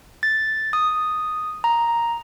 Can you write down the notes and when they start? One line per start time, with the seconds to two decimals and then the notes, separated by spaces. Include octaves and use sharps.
0.23 A6
0.73 D#6
1.64 A#5